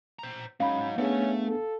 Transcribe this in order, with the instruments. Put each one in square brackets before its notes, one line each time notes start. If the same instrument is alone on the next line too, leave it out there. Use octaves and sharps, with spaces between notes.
[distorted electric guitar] C5 A#5
[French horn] F#3 [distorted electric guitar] G#3 D#4 [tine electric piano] C#4 B5 [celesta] F5
[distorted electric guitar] A3 A4 [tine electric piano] B3 D4 G#4 [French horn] C#4
[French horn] A4